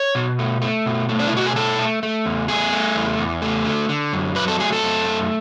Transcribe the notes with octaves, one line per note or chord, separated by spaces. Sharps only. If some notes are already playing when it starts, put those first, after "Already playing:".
Already playing: C#5
B2
A3
A3
B2
A3
D4
E4
B2 F#4
G#4
A3 A4
A3
A3
E2
A3 G#4
A3
E2
E2
A3
D3
D3
F#2
F#3 B4
A4
A3 G#4
A4
F#2
A3